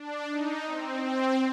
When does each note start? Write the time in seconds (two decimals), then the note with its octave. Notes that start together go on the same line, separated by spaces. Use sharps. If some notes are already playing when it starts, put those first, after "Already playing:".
Already playing: D4
0.31 D#4
0.66 C4
1.03 C4